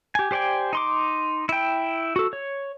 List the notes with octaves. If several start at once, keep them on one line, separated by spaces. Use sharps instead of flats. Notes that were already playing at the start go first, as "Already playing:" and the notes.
G4 G#5
G4 C5 D5 G5 G#5
D#4 C6 D6
E4 G5
F#4 A4
C#5